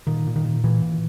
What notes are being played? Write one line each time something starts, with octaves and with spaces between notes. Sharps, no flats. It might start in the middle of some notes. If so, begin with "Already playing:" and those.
A#2 D#3
A#2
D#3
A#2
A#2 E3
A#2